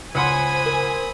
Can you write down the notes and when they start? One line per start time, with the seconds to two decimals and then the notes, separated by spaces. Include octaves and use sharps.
0.15 C#2 C5 F#5 G#5 B5 C6 D#6
0.66 A#4